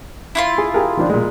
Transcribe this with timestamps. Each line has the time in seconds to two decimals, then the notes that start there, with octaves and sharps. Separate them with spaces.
0.35 E4 F4 C6
0.58 G#4
0.74 G4 G#4 A#4
0.97 D#3 F3 D4
1.10 A#2 G#3